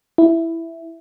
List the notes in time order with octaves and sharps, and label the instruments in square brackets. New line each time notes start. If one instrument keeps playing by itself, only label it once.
[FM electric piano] E4